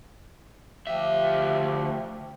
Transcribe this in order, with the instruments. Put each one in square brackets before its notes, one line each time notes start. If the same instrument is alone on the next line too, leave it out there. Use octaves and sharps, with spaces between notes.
[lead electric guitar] D2 E5 [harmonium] F3 G4